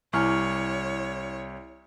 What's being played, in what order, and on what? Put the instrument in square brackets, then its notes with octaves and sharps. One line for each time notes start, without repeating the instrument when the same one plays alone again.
[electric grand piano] C2 [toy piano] E4 G#5 D6 [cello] C#5 [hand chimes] C#6 F6